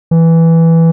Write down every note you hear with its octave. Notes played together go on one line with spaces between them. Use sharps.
E3